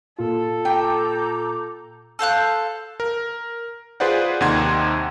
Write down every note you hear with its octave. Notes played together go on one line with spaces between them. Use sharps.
A#2 F4 A4
G5 A#5 D6 G6
A4 C5 F5 F#6
A#4
F4 G#4 B4 C5 D5 F#5
D#2 C3 D#4 F#5 C6 G#6